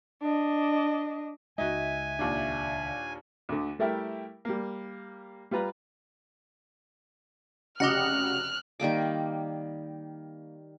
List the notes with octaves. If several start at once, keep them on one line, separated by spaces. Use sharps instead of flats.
D4 D#5
C#2 G#3 D#4 F#4 E5 G#5
D#2 A#2 D4
D2 D3
G3 A3 E4 G4 A#4
G3 A#3
G3 F4 B4 A#5
F1 C#3 F#4 G4 D#5 F#5 F6 F#6
D#3 G3 A#3 D6